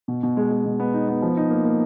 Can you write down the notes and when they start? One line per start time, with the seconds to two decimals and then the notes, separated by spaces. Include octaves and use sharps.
0.08 B2
0.23 B2
0.37 G#3
0.51 G#3
0.66 B2
0.80 B3
0.94 D#4
1.08 B3
1.22 F3
1.37 D#4
1.50 A#3
1.65 A#3